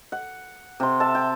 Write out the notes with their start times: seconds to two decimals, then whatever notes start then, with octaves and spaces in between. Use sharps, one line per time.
0.12 F#5
0.80 C3 C6
1.00 E5 A5
1.15 G5